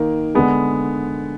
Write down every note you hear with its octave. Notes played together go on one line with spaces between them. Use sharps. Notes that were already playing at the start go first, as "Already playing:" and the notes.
Already playing: D#3 A#3
D3 G#3 B3